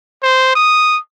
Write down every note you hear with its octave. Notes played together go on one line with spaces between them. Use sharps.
C5
D#6